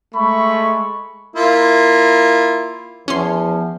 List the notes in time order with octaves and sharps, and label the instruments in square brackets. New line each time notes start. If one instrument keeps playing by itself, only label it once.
[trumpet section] G#3 A3 B5 C#6
[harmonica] A#3 E4 F4
[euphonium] E2 [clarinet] F3 [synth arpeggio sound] C#4 C6